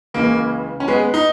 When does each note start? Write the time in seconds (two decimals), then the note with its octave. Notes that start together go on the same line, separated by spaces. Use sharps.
0.14 C#2 C#3 E3 A#3
0.80 C#4
0.88 G#3 B3
1.14 D#4